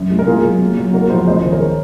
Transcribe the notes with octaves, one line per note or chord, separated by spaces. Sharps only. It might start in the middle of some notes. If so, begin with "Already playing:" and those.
Already playing: F#2
G#3
A#4
A#3 F4 G#4
F#3
A#3
F#3
A#3 F#4 A#4
F3 G#4 C5
C#2 C5 D#5
D#3 G#4 C5
A#4 C#5